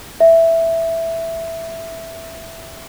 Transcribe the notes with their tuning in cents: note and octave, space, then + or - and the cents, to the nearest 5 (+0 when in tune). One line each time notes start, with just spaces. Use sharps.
E5 +5